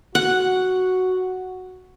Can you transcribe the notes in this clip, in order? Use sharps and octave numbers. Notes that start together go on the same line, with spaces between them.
F#4 F#5